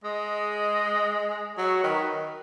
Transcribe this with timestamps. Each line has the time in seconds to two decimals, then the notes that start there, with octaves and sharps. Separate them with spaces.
0.04 G#3 D#5
1.57 F#3 C#5
1.83 D#3 B4